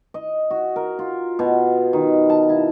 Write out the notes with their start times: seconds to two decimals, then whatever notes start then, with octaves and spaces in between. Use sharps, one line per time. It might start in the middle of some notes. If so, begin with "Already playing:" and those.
0.14 D#5
0.51 F#4
0.76 A#4
0.99 F4
1.39 B2
1.93 D#3
2.30 A5
2.50 E4